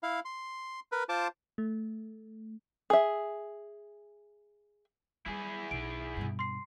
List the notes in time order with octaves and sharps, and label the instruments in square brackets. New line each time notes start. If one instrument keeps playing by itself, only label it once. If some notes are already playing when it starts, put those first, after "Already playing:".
[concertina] E4 F5
C6
A#4 B4
F4 C5 A5 D6
[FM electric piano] A3
[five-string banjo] G#4 E5
[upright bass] F#3 G3 [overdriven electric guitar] E4 G#4
[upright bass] B1 [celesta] D7
[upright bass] G2 B2
[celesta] C6 C7